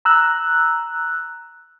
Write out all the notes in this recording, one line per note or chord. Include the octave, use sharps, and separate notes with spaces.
A#5 E6 F#6